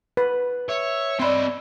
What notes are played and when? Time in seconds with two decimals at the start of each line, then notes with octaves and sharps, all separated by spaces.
0.17 B4
0.69 C#5 E5
1.19 C4 D5 D#5 B5 C6